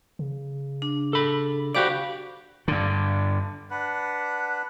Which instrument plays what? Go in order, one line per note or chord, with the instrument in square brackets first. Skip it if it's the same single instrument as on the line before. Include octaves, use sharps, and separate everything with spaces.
[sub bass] C#3
[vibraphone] D4
[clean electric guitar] A4 B5
[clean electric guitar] F#4 G4 D5 [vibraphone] C5 F5 B5
[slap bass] G2 D3
[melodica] D4 B4 F#5